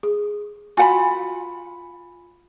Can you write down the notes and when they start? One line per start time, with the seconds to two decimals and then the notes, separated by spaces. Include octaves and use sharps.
0.03 G#4
0.77 F4 F#4 F#5 G#5 B5